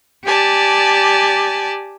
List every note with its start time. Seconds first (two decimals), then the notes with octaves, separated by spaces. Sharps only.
0.23 G4 D5 G#5 A5